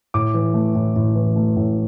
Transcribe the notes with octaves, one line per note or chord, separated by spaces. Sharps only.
A2 D6
E3
A3
A2
A2
E3
A3
A2